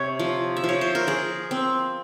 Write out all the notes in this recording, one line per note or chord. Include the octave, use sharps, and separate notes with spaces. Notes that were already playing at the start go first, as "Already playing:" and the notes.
Already playing: C3 C#5
F3
E5
F3
C#5
C5
A#4
F3 G#4
C4